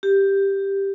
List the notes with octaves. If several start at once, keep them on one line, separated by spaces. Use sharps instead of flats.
G4